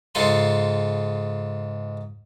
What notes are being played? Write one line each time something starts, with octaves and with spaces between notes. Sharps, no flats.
G#2 C#3 F4 A4 G#5 C6